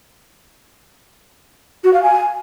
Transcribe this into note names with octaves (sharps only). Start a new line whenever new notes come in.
F#4
F5
G#5